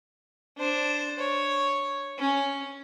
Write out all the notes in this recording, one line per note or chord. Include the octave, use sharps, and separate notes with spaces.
D4 C5
C#5
C#4